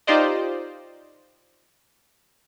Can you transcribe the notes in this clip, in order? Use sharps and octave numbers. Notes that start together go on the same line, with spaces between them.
D#4 F4 G4 C5 D5 D#5